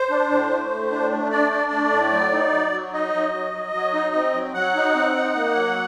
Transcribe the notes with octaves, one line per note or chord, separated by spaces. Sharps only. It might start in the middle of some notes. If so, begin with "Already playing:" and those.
Already playing: C5
D4
A2
A3
A2
D4
A3
D4 D5
D4
A3
A2
F#3
D#4
F#3
F#3
D#4 D#5
F#3
F#3
F#3
F#3
D#4
C4
F#3
F#3 F#5
D#4
C4
D#4
A#3
F#3